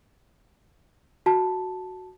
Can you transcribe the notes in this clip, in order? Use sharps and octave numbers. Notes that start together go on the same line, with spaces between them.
F#4 A5